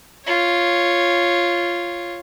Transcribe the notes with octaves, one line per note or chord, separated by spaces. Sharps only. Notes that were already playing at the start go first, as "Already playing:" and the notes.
F4 C#5